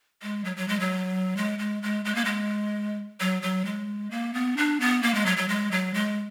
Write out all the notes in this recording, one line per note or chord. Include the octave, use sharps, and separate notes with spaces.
G#3
F#3
F#3
G#3
F#3
G#3
G#3
G#3
G#3
A#3
G#3
F#3
F#3
G#3
A#3
B3
D4
B3
A#3
G#3
F#3
F#3
G#3
F#3
G#3